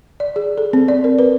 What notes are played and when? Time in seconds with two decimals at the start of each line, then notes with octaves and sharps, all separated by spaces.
0.20 D5
0.36 G#4
0.58 A4
0.73 C4
0.88 D5
1.04 A#4
1.19 B4